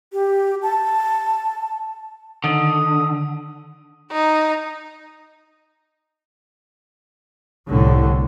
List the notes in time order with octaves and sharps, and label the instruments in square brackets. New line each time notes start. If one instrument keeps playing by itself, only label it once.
[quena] G4
A5
[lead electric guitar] D3 [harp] D#3 A6 [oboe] D#6
[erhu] D#4
[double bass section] C2 A2 D3